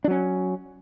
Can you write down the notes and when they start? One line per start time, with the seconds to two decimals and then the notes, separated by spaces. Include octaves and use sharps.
0.04 D4
0.08 F#3
0.11 C#4